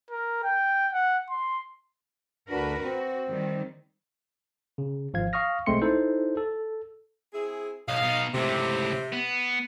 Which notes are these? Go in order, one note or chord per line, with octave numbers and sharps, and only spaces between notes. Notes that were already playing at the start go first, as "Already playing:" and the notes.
A#4
G5
F#5
C6
D2 D4 F#4 A#4 B4
C4 F#4
D#3 G3
C#3
G#1 F3 F5 G#6
F5 C#6 D#6 F6 A#6
B1 G#3 A3 C4 C6 C#7
D#4 E4 A4 C5
A4
C4 E4 G#4
B1 D#5 F5
B2 D#4
C#2 A2 C3
B3